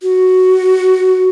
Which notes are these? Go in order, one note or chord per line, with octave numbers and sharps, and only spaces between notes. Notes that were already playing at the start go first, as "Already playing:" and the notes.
F#4